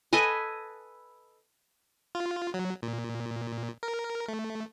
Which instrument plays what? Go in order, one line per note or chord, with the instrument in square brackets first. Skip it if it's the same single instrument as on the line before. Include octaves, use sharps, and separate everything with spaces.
[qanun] A4 B4 D#5 G#5
[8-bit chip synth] F4
F#3
A#2
A#4
A3